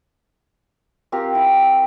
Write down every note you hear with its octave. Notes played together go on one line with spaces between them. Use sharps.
C4 F4 G4 A#4
E4